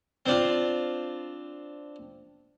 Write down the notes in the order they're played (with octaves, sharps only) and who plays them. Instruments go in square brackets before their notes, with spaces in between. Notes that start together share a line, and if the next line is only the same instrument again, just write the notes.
[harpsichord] C4 D4 F4